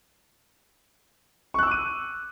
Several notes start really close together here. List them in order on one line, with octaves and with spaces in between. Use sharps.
C#6 F#6 E6 D6 D#7